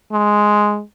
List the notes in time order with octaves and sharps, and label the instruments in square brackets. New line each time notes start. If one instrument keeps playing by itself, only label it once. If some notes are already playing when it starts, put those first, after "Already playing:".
[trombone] G#3